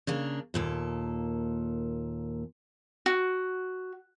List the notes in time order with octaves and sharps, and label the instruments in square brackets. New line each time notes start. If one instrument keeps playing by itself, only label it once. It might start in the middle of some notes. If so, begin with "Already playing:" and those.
[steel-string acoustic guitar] C#3 A#3 D4
D#2 A#2 A4
[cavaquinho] F#4